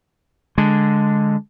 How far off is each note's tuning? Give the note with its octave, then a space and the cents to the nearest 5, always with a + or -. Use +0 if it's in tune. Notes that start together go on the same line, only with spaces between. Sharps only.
D3 +0 G#3 +0